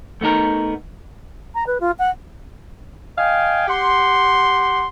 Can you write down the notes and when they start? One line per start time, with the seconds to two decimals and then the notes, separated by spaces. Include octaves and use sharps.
0.21 A3 B3 D#4 A#4
1.54 A#5
1.66 B4
1.80 F4
1.98 F#5
3.18 D#5 F5 G5 G#5
3.68 G4 F#5 C6